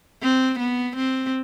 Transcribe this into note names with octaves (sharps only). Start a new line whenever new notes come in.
C4
B3
C4